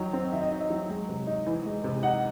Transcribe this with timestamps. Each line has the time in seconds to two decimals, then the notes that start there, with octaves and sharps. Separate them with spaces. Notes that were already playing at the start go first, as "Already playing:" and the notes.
Already playing: D#3 F#3 D#4
0.13 C4
0.32 D#3 E5
0.42 D#5
0.51 D#4
0.60 D#5
0.70 F#3
0.89 G#3
1.09 C3
1.27 D#4
1.46 E3
1.66 G#3
1.84 C3
2.03 D#4 F#5